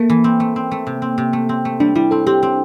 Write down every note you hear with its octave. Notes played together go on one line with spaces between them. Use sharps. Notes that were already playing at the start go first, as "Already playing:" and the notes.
Already playing: A3 A#3
E3
C4
A3
C4
A3
C3
C4
C3
A3
C4
A3
G3 D4
G3 E4
C4 A4
C4 G4
C4